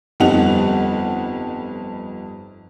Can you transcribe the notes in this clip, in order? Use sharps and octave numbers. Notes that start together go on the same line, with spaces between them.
G1 F2 G3 D#4 F#5 F7